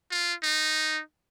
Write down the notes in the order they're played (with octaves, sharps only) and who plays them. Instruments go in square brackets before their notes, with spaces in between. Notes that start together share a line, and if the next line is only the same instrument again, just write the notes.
[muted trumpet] F4
D#4